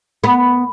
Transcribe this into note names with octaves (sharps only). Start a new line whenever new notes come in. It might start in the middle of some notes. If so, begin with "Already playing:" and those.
B3